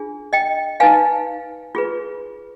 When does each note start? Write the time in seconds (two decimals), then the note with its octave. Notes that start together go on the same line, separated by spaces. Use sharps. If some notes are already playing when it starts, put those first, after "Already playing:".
Already playing: D4 F4 G#4
0.33 D#5 G5
0.80 D#4 B4 F5 G#5
1.75 F4 G#4 B4